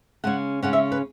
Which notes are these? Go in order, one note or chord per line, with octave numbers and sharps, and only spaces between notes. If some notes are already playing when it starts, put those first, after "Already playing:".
C#3 G#3 C#4 F#5
C#3 G#3 C#4 F#5
E5
B4